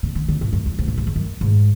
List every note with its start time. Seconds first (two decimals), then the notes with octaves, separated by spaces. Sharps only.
0.03 C#3
0.15 D3
0.28 D3
0.41 A2
0.53 F#2
0.66 E2
0.79 G#2
0.88 A2
0.98 G#2
1.07 E2
1.16 F#2
1.41 G#2